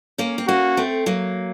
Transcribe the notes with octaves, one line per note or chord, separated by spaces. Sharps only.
A#3 C#4
C4
A#3 C#4 F#4
A3 C4
F#3 A#3